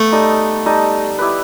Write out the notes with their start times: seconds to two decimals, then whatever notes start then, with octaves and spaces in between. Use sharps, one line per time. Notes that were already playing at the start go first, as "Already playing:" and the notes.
Already playing: A3 B3
0.12 G3 D#4 A4 D#5
0.66 G3 D#4 A4 D#5
1.18 E4 G4 B4